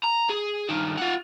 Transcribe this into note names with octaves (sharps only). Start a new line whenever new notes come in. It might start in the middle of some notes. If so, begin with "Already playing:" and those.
A#5
G#4
G2 D#3
F4 F#5